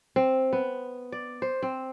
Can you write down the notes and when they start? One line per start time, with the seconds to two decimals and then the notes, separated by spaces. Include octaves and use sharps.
0.16 C4
0.53 B3
1.12 D5
1.42 C5
1.62 C4